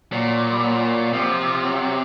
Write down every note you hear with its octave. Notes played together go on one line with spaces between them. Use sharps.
A#2 F#3
G3
F#3
C3 F3
F#3
F#3